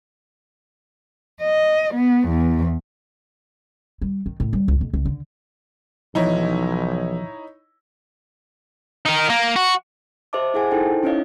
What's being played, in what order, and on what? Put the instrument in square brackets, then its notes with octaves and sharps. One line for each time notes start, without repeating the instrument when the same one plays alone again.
[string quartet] D#5
B3
E2
[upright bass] G3
D#3
A2
G3
C#2
B1
C#2
D3
[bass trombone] B1 [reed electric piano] E3 F3 [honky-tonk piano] D#4 E4 C#5
[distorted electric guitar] D#4 A#4
A#3
F#4
[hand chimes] G4 C5 D#5 E5 A5 D6
E4 G#4 F#5 G#5
D#4 E4 A4 C5 G5 A5
C#4 D#4 E4 C#5 D#5 F5